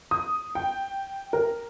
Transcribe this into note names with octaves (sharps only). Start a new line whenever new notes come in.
D#6
G5
A#4